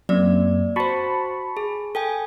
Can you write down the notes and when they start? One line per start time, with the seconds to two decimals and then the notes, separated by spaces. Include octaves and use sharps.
0.09 F#2 A#3 C4 D5
0.76 F#4 C5 A5 B5 C#6
1.57 G#4
1.95 A4 G5 G#5